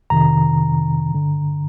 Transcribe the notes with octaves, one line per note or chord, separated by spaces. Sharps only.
F2 C3 D#3 A#5
G2 D3